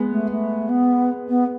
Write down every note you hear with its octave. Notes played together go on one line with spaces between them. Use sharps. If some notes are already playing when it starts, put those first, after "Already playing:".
Already playing: G#3 B3
A3
A3
B3
B3